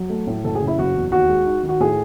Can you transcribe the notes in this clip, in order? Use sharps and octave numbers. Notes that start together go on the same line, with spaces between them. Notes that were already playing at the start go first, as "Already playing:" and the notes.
Already playing: F#3
A3
A2
F#1 A4
G#4
C#3
E4
F#1 F#4
E2
D#2 F#4
G#3
D#4
D#3
F#4
A2 G#4